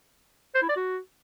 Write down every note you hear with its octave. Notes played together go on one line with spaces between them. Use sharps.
C5
E4
D5
F#4